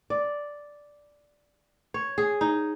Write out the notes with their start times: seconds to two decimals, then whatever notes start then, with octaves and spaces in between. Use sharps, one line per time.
0.10 D5
1.94 C#5
2.18 G#4
2.41 D#4